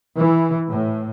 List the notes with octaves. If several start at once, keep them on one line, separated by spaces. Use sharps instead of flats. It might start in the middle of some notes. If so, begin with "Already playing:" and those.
E3
A2